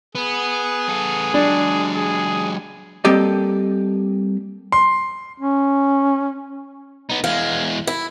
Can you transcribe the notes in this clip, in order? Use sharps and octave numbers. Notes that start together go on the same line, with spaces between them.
B3 G#4
B3 A4
F#3 G#3 D4
G#4
G3 A#3 C4 G4 A4 D#5
C6
C#4
B3 D#4
E2 G#3 F5
E4